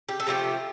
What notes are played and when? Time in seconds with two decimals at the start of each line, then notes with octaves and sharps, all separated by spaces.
0.09 G4
0.20 A4
0.27 C3 F3 A3 D4 G4